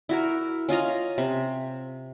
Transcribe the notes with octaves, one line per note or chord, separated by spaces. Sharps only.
E4 F#4 A#4
C#4 F4 D#5 A#5
C3